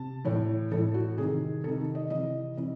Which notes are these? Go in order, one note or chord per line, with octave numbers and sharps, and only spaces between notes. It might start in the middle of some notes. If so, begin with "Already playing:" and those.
Already playing: C3 A5
A2 E3 C#5
A2 E3 A4
F#4
C3 D#3 G#4
C3 D#3 A4
D#5
C3 E3 D#5
C3 E3 D#5